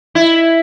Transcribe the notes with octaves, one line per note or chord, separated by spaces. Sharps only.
E4